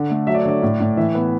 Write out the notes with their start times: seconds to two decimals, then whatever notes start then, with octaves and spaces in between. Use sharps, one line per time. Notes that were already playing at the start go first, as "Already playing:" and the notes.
Already playing: D3
0.10 A3
0.27 F#3 E5
0.34 D5
0.42 C#5
0.45 D3 D5
0.62 A2
0.80 A2
0.97 E3 E5
1.15 B3